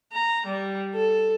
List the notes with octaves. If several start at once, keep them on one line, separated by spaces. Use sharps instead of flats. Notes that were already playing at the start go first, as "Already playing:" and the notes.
A#5
G3
A4